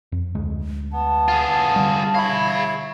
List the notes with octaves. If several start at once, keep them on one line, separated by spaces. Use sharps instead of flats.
F2
D2 G#3
B3 A5
F4 G#4
D3 G3
E4 C#5 F5 B5